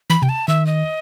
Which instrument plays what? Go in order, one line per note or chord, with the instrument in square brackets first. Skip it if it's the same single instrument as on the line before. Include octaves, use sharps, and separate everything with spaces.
[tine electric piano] E3 [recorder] B5
[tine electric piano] C3 [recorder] G5
[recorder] A5
[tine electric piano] D#3 [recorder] E5
[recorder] D#5